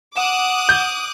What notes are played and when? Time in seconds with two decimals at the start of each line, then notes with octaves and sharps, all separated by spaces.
0.16 F#5 D6 D#6 F#6 E7
0.69 G6